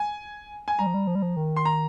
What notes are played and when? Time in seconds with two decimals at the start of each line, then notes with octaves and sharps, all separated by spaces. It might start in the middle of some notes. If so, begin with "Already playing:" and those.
Already playing: G#5
0.68 G#5
0.79 G3 A#5
0.86 F3
0.94 G3
1.07 F3
1.15 G3
1.22 F3
1.36 D#3
1.56 C6
1.65 A#5